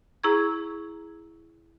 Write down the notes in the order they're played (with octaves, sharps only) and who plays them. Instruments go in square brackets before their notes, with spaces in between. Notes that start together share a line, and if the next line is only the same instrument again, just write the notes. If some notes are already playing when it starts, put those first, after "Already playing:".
[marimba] E4 G#4 A#5 C#6 G#6